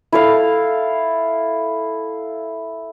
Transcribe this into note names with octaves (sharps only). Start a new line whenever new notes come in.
E4 A4 F5